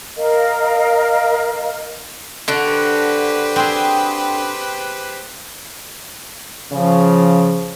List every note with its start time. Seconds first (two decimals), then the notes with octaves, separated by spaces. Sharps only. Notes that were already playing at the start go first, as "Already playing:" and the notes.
0.17 A#4 D#5 F5
2.48 D3 D4 F#4
2.65 G4 B4 C5
3.56 C4 G#4
6.72 C#3 F3